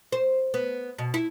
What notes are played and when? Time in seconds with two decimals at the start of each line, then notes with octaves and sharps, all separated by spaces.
0.12 C5
0.54 B3
0.99 B2
1.14 E4